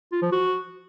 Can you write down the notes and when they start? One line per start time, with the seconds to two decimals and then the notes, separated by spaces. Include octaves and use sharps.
0.12 F4
0.22 F3
0.32 F#4